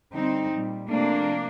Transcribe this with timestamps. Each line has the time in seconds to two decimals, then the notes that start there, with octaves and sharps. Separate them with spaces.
0.12 D3 G3 C4 D#4
0.52 A#2 G3
0.89 C3 F3 A3 A#3 D4